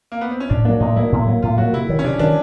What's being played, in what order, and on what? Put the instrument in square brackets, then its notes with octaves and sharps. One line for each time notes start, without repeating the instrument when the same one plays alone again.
[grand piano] A#3
B3
C4
C#4
[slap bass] A2 [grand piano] D4
[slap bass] F#3 A#3 [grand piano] D4
[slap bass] A2 [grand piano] D#4
[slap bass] F#3 A#3 [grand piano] E4
[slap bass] A2
F#3 A#3
[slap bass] A2 [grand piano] F4
[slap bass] F#3 A#3 [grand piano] F#4
[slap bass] C3 [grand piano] E4
[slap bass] D#3 F#3
[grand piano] C#4
[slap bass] C3 [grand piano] D4
[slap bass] D#3 F#3 [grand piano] D4